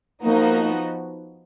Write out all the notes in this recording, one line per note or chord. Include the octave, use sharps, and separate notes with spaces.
F3 A#3 B3 D#4 F#4